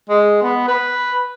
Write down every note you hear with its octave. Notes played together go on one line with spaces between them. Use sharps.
G#3
B3
B4